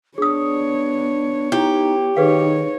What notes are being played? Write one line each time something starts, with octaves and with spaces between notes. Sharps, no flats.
B3 D4 G#4 C#5 D#6
D#4 E4 G4
D#3 D#4 G#4 B4 C#5 F5